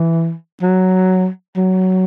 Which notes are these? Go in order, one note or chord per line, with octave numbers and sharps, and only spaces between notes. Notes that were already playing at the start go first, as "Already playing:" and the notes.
Already playing: E3
F#3
F#3